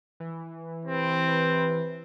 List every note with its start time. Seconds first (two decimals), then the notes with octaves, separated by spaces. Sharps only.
0.20 E3
0.85 C3 C4 B4